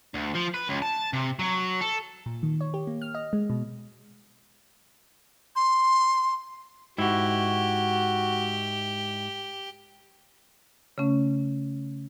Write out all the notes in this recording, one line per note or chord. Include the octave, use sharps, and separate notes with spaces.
D2
F3
B4
C#2
A5
C3
F#3
A4
A#2
D#3
C#5
G4
A#3
F6
D#5
G#3
B2
C6
G#2 E4 F#4 G4
C#3 A3 C#4